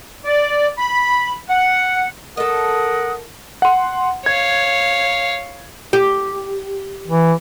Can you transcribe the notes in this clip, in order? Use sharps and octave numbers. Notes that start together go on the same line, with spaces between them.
D5
B5
F#5
A4 A#4 D#5 F#5 D#6
F#5 C6
C#5 F5 G#6
G4
E3